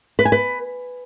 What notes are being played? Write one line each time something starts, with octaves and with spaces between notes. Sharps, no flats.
B4
G#5
B4